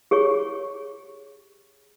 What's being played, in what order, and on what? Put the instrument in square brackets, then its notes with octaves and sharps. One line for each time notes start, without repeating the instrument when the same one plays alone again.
[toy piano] G4 G#4 C#5 C#6